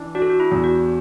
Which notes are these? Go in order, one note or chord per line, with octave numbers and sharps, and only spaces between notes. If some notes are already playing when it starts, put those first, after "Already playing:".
Already playing: E3 D4
D4 F#4
A4
F#4
E4
E2
F#4